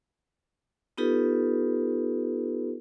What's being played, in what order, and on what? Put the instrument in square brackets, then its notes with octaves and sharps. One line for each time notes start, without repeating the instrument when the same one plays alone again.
[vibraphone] B3 D#4 F4 G4 A4 B4